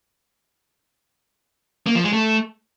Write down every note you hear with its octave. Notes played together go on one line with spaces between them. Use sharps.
A#3
F3
G#3
A3